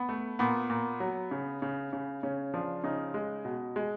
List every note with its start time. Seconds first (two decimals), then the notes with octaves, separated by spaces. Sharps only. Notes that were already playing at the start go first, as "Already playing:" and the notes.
Already playing: B3
0.09 A3
0.39 A#2 B3
0.70 A#2
1.00 F#3
1.31 C#3
1.62 C#3
1.93 C#3
2.23 C#3 C#4
2.54 F3 D4
2.84 C#3 D#4
3.14 G#3
3.45 B2
3.76 G#3